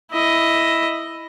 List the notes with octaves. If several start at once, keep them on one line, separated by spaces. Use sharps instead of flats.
E4 D#5